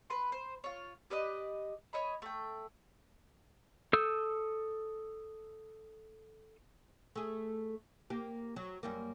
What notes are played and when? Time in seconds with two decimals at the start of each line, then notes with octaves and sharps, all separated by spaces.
0.10 B4 C6
0.32 C5
0.64 F4 C#5
1.10 G4 B4 D5 D#5
1.93 C#5 D#5 B5
2.22 A3 G5
3.93 A4 D#6 E6 G6
7.16 A3 G#4
8.10 A#3 G4
8.56 F#3
8.83 F#2 G3 A#3